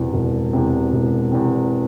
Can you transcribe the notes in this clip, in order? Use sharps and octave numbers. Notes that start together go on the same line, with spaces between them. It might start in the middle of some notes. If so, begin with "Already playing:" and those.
Already playing: E1 E2 C3
E1
E2 C3
E1
E2 C3